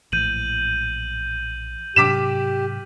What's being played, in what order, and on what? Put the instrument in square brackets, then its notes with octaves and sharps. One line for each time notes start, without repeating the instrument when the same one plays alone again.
[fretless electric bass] A#1 A2 E3 [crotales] G6 D#7 F#7
[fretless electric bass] G#2 C3 F#3 [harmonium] G4 [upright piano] D6 B6 E7